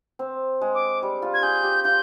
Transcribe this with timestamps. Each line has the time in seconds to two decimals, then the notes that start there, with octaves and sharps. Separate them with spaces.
0.19 C4
0.61 G#3
0.75 D6
1.03 G3
1.22 F4
1.34 G#6
1.42 G#4 G6
1.63 G4
1.84 F4 G6